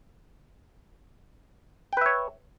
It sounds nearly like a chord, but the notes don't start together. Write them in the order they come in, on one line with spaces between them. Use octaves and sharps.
G5 B4 E5 C#5